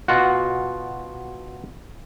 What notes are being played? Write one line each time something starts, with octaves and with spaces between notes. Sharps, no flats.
B2 F4 F#4